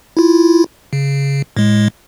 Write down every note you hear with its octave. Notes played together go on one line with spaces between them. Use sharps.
E4 F4
C#3
A2 G#3